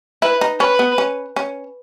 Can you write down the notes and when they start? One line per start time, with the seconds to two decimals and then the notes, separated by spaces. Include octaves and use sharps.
0.22 E4 B4
0.41 D#4
0.60 C#4 B4
0.79 B3
0.98 C#4
1.36 C#4